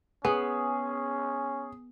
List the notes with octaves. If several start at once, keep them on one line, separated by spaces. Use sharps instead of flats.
B3 C#4 G#4